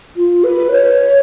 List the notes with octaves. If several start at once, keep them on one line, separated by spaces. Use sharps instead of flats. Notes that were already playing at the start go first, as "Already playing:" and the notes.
F4
B4
C#5